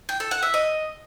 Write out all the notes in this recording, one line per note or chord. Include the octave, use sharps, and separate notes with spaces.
G5
A4
F#5
E5
D#5